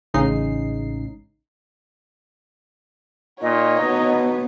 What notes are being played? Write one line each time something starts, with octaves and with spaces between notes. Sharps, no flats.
A1 C#3 G#3 D#4 C7
A#2 D#4 C#5 D#5
B2 B3